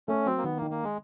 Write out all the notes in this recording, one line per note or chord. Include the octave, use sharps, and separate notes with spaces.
A3 C#4
F#3 C4
A#3
D#3 B3
A#3
D#3
A#3
G#3